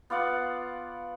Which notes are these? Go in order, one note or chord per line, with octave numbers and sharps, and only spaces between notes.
B3 F4 D5 F#5